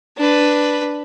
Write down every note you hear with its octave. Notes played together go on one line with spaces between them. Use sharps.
D4 B4